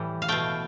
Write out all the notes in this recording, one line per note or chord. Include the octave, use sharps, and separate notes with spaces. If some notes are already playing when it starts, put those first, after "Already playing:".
Already playing: A2 E3 G3
F5
B2 A3 G5